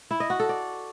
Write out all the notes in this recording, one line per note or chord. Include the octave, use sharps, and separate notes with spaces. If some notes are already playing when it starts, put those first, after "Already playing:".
E4
D#5
F#4
A4
D5